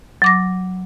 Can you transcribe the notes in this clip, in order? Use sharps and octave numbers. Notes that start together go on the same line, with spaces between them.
F#3 D6 A#6